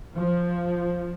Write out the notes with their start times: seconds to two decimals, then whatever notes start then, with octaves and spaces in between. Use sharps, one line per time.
0.15 F3